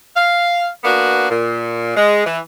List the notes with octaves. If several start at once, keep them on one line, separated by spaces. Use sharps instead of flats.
F5
A#3 B3 D4 F#4
A#2
G#3
E3